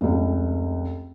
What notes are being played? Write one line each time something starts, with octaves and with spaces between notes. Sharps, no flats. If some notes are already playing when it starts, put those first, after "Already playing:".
F1 C#2